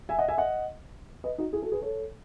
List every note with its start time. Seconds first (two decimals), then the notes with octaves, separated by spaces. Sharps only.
0.09 E5 G#5
0.19 D#5 F#5
0.28 E5 G#5
0.38 D#5 F#5
1.24 B4 D#5
1.38 D#4 F#4
1.53 E4 G#4
1.62 F#4 A4
1.72 G#4 B4
1.82 A4 C#5